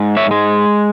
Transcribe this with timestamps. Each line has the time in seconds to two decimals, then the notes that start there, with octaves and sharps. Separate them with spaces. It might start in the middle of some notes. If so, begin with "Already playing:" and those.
Already playing: G#2
0.17 C#5 E5
0.31 G#3